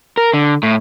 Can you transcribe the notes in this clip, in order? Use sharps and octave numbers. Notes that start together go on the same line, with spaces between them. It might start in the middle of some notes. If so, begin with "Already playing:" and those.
A#4
D3
A2